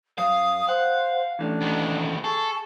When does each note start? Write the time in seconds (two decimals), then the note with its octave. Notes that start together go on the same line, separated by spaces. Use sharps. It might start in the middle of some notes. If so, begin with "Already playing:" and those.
0.18 F#2 F5 D#6
0.69 C5 F#5
1.39 E3 A3 C#4 D4
1.61 D2 D#3
2.24 G#4 A4 C#6